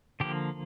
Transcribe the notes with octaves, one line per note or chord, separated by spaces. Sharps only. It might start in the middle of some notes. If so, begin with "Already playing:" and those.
D3 F3 A#3 G4